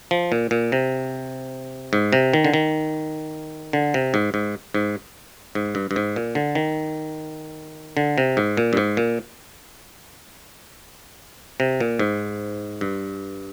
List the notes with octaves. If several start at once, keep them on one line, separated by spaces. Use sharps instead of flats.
F3
A#2
A#2
C3
G#2
C3
D#3
D3
D#3
D3
C3
G#2
G#2
G#2
G#2
G2
G2
G#2
A#2
D3
D#3
D3
C3
G#2
A#2
G2
G#2
A#2
C3
A#2
G#2
G2